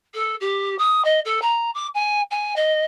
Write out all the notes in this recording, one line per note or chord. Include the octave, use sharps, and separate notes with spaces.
A4
G4
D#6
D#5
A4
A#5
D6
G#5
G#5
D#5